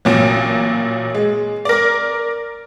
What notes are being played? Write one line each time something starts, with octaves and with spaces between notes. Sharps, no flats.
A1 A#2 F#3
G#3
A#4 D5